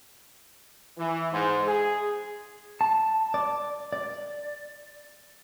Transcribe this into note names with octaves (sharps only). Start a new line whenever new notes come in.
E3
G#2
G#4
A5
D5
D5